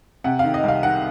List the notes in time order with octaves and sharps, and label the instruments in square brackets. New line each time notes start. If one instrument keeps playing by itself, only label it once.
[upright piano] C3 F#5
D#3 F5
D#5
C2 F5
D#3 F#5